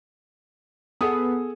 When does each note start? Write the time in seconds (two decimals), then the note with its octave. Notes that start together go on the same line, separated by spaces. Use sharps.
1.01 B3 G#4 A4 D#6